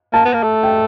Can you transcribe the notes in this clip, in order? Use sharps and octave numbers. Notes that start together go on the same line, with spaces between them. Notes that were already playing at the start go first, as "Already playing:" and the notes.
A#3 A5
B3
A#3
A3
G5